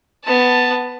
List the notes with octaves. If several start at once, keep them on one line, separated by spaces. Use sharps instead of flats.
B3 A5